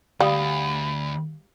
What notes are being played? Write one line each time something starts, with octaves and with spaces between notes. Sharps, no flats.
D2 G3 F5 B5 D#6